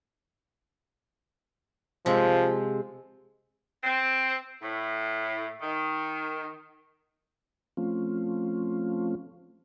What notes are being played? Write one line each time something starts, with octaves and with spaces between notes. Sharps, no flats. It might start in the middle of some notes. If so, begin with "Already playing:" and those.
C3 F3 G#3
C4
A2
D#3
F3 A3 C4 C#4 F4